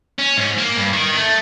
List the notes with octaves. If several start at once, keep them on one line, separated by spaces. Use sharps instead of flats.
C#4
G#2
A#3
G2
D#3
A3